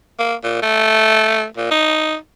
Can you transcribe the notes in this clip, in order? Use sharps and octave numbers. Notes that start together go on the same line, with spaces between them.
A#3
A#2
A3
A#2
D#4